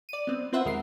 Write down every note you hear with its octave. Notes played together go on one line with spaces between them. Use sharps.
D5 D#7
B3 C4
C4 F4 B4 C5 E5 F#5
D#2 G#3 A#4 C7